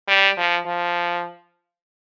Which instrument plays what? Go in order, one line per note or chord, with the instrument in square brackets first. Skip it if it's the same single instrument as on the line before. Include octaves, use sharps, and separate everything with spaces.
[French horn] G3
F3
F3